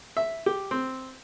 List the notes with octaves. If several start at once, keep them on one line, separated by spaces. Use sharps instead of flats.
E5
G4
C4